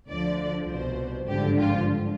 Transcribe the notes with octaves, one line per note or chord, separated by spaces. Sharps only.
D2 D3 F3 D5
C2 B2 C5
G#1 G2 D3 F3 G4
F4